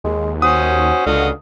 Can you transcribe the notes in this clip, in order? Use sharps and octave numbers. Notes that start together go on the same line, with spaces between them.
D#2 G#3
C#4 F#4 C5 D#6
C#2 D3 F#4 D#5 F5